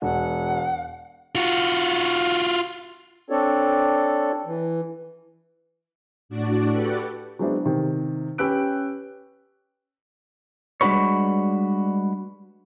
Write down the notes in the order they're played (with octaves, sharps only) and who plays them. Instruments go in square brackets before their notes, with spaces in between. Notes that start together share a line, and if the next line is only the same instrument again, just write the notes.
[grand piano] E1 [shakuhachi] F#5
[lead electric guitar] F4 F#4
[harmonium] C4 D4 A4 C#5 D5
E3
[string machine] A2 D4 F#4 D5
F#4 G4 A4 B4 D5 F#5
[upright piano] F#3 G#3 B3 C4 D4 E4
C3 D#3
C#4 G4 B4 E6 F#6 D7
[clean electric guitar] G3 G#3 D4 F#4 B4 C#5